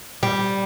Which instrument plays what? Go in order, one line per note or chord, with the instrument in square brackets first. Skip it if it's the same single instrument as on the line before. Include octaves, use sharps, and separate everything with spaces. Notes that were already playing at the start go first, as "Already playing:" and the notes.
[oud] G3